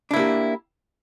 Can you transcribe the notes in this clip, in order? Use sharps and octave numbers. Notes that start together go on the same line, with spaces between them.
A#3 D4 E4 G4